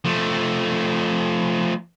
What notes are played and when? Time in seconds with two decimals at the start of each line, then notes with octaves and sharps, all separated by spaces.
0.05 F3 A3